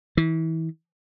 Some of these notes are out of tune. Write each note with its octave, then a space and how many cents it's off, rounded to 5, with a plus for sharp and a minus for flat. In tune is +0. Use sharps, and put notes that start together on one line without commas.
E3 -30